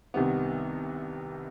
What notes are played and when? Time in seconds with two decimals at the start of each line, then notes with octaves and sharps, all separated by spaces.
0.14 C2 C3 D#3 G3 B3